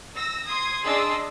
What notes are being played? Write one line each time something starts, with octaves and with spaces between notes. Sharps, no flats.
E6 A#6
C6 D#6 G#6
D4 G#4 D#5 C6 E6 A6